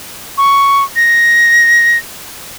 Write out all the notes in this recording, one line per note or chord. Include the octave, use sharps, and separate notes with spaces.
C#6
A#6